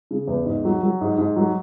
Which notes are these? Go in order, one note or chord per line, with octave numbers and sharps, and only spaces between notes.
C#3
E2
G#2
F#3
F#3
G#2
G#2
F#3